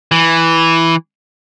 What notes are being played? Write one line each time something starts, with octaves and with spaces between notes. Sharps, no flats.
E3